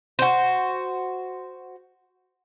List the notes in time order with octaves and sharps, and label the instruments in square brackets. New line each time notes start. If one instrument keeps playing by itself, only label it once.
[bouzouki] F#4 C5